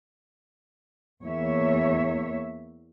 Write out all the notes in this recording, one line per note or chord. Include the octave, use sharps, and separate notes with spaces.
E2 A#3 C#5 E5